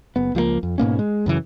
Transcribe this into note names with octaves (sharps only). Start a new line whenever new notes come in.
F#1 B3
C#2 F3 G3 A#3
F2
G#2 B2 A#3 C#4
G#3
F#2 C#3 E3